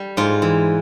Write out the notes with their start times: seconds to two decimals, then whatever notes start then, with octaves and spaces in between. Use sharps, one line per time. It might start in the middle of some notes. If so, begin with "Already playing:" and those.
Already playing: G3
0.17 G#2 F4
0.42 E3